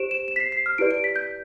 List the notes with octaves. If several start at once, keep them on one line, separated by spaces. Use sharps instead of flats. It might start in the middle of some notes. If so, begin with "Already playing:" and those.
Already playing: G4 C5 D7 E7
E7
E7
B6
C7
C7
F6
E4 G4 B4 D5 D7
D7
B6
G6